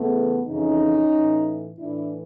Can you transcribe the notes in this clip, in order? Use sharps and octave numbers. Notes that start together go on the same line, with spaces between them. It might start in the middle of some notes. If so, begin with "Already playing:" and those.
Already playing: E2 C#3 E3 A3 B3
F2 C#3 E3 C#4 D#4
A2 E3
A2 E3 D4 E4